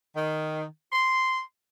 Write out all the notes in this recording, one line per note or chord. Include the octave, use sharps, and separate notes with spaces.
D#3
C6